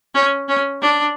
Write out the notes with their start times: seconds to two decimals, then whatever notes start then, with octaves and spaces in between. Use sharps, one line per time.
0.14 C#4
0.49 C#4
0.82 D4